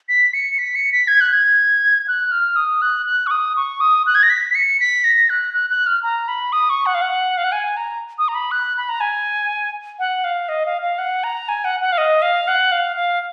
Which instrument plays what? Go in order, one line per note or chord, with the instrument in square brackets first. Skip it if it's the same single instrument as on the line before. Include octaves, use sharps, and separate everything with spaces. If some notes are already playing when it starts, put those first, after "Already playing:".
[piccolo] B6
C#7
B6
C#7
B6
G#6
F#6
G#6
F#6
F6
D#6
F#6
F#6
C#6
D#6
C#6
D#6
F#6
G#6
A#6
B6
B6
C#7
B6
A#6
F#6
F#6
F#6
F6
A#5
B5
D#6
C#6
F#5
F5
F#5
F5
F#5
G#5
A#5
D#6
A#5
B5
F#6
B5
A#5
G#5
F#5
F5
D#5
F5
F5
F#5
A#5
G#5
F#5
F#5
F5
D#5
F5
F#5
F5
F5